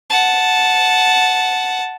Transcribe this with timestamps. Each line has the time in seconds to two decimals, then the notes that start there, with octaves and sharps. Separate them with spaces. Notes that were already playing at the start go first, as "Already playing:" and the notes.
0.10 F#5 A5